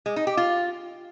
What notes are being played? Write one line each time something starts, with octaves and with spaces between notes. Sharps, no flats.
G#3
D#4
G4
F4